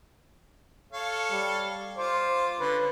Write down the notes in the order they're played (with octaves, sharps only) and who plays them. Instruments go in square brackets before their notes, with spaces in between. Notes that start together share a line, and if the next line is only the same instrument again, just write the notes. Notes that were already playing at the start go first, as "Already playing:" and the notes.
[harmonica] A4 C#5 F5
[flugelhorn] G3
[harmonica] F4 D6 [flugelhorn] C5
[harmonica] D3 C#4 [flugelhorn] B4